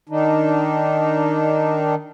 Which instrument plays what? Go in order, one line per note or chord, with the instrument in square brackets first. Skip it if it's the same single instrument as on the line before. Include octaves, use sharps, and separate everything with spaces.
[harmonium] D#3 D4 D#4